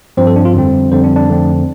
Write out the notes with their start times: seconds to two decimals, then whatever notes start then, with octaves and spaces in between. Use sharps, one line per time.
0.17 G2 F3 C4 C5
0.27 A4
0.36 D4
0.45 F4
0.54 F2 D3 G3 C4
0.91 F2 D3 G3 C4 C5
1.04 D4
1.16 D4
1.29 F2 D3 A3 C4